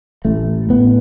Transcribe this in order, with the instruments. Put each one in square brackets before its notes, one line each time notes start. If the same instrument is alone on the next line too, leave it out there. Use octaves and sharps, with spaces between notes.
[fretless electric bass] A1 A3
A2 B3